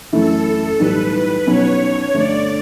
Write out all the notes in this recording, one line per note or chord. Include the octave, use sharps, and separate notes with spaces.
F#2 E3 A3 E4 A4
B1 A2 E3 G3 B4
B1 B2 F#3 C#4 C#5
G2 D3 A3 D5